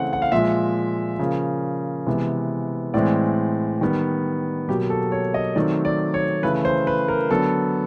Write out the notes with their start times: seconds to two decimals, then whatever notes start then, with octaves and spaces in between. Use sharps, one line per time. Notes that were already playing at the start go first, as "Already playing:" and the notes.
Already playing: C#3 E3 A3 C4 F#5
0.13 F#5
0.22 F5
0.32 A#2 F3 G#3 E5
1.19 C#3 F3 A#3
2.06 C3 E3 G#3 B3
2.94 A2 E3 G#3 C4 D5
3.81 D#3 G3 B3
4.68 B2 F#3 A#3 G4
4.90 A4
5.12 C#5
5.34 D#5
5.55 D#3 F#3 A3 C4 D5
5.85 D5
6.14 C#5
6.43 C#3 E3 A3 B4
6.65 C5
6.87 B4
7.08 A#4
7.30 D3 F#3 B3 A4